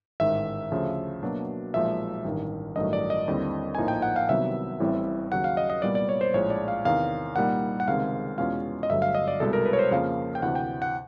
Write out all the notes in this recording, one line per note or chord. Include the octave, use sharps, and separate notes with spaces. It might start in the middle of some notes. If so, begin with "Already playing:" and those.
A1 G#2 D#3 E5
D2 C#3 F3 A3
B2 F#3 A#3 D4
B1 A#2 F3 G#3 E5
A1 G2 D#3
A1 G2 D#3 F#3 A3 D#5
D5
D#5
D#2 D3 G3 C4 E4
A#1 A2 F3 A#3 D#4 G#5
G5
F#5
F5
C2 C3 D#3 F#3 B3 E5
A1 A2 E3 G3 C4
D#2 C#3 F#3 F#5
F5
D#5
D#5
C2 A#2 G3 B3 D5
D5
C#5
C5
A#1 A2 F3 G#3 C#5
D5
F5
E2 C3 D#3 F5
C2 A#2 G3 A#3 D#4 F#5
F#5
C#2 C3 D#3 G#3 C4 F5
E2 B2 G#3 C#4 F4 F5
D#5
G1 G2 D3 F#3 A3 E5
F5
D#5
D5
C2 B2 G#3 A4
A#4
B4
C#5
C5
F2 C#3 F3 A#3 F5
G5
D2 C3 E3 F#5
G5
F#5